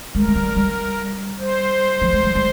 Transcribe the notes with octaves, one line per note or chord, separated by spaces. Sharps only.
G#3 A#4
G#3
G3
G3
C5
F3
G#3
G3
G3